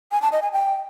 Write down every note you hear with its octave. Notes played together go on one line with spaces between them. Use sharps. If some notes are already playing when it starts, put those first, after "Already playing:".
G#5
A5
D#5
G#5
G5